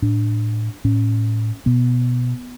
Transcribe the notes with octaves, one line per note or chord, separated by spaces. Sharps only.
A2 D4
A2 C#4
B2 B3